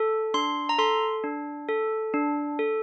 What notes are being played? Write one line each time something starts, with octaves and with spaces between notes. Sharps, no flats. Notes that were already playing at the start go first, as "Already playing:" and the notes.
Already playing: A4
D4 C6
A#5
A4 C6
D4
A4
D4
A4